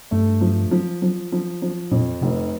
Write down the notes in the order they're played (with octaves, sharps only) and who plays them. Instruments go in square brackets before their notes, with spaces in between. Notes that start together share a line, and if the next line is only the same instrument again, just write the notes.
[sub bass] G2 [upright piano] A3
[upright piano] F3
F3
F3
F3
F3
[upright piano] F2 [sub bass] A#2
[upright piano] F1 [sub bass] C3